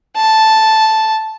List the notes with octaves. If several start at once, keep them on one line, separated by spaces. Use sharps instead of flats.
A5